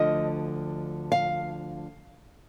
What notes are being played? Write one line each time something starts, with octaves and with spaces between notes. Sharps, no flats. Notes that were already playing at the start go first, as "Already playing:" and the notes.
Already playing: D2 D3 F3 D#5
F5